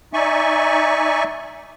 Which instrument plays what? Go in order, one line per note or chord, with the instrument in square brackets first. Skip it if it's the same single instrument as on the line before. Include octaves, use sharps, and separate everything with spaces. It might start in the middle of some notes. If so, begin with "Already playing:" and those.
[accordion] D#4 D5 E5 G#5 C#6